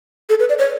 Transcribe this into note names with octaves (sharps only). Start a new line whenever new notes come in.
A4
B4
D5
C#5